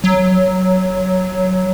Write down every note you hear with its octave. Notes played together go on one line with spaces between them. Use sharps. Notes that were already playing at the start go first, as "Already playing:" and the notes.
F#3